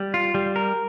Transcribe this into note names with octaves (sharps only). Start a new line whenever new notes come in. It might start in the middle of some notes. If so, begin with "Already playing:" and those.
Already playing: G3
F4
G3
A#4